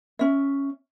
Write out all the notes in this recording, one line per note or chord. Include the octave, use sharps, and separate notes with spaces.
C#4 E5